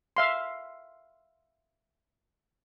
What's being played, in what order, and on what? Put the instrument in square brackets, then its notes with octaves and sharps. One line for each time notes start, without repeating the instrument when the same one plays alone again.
[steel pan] E5 F5 C6